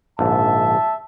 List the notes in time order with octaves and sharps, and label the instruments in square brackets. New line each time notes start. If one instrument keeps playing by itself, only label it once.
[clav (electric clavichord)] A#1 G#2 D3 [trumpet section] E5 A5